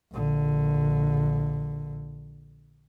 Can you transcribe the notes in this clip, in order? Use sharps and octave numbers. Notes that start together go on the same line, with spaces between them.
A#1 D3